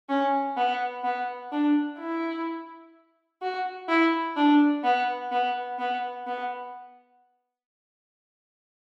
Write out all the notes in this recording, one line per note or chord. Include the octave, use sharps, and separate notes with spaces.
C#4
B3
B3
D4
E4
F#4
E4
D4
B3
B3
B3
B3